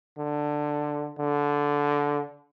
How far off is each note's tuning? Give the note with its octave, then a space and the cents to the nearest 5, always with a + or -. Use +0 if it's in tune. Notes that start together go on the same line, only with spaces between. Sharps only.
D3 +10
D3 -15